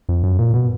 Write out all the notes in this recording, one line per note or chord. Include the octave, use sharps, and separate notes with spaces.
F2
F#2
A#2
B2